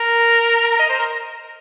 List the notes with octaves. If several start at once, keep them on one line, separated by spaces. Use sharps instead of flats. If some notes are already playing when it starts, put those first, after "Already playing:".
Already playing: A#4
D#5
C5
A#4